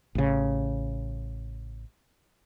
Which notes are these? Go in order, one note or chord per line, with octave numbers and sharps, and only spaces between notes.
A1 C#3